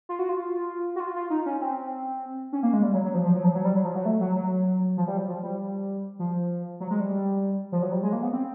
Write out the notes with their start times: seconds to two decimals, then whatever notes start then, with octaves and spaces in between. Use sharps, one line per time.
0.09 F4
0.19 F#4
0.29 F4
0.96 F#4
1.00 F4
1.15 F4
1.30 D#4
1.46 C#4
1.61 C4
2.53 C#4
2.63 A#3
2.73 G#3
2.83 G3
2.94 F#3
3.04 F#3
3.14 F3
3.24 F3
3.35 F#3
3.44 F3
3.55 F#3
3.65 G3
3.75 F#3
3.85 F3
3.95 F#3
4.05 A3
4.21 F#3
4.36 F#3
4.97 F3
5.07 G3
5.17 F#3
5.28 F3
5.43 G3
6.19 F3
6.80 F#3
6.91 G#3
7.00 G3
7.72 F3
7.82 F#3
7.92 G3
8.03 G#3
8.13 A#3
8.23 B3
8.33 C4